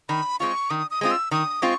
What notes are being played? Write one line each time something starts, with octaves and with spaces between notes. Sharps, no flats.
D#3 B5
G#3 C4 F4 C#6
D#3 D#6
D#6
G#3 C4 F4 D#6
E6
D#3 D#6
G#3 C4 F4 C#6